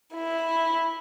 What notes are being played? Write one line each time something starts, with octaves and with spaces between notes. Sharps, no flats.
E4